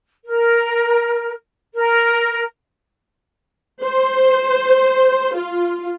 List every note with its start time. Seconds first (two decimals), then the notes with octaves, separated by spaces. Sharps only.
0.25 A#4
1.75 A#4
3.84 C5
5.36 F4